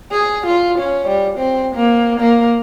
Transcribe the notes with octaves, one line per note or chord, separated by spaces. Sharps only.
G#4
F4
C#4
G3
C4
A#3
A#3